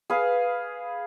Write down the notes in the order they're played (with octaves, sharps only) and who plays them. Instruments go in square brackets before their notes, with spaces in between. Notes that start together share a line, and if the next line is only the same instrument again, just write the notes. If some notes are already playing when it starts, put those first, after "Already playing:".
[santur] G#4 B4 F5